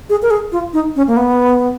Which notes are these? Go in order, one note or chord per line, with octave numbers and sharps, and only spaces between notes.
G#4
A#4
G#4
F4
D#4
C#4
A#3
B3